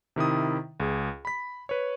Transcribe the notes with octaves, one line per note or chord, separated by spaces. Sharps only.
C3 D#3 E4 D#6
C#2 G#4
B5 B6
B4 C#5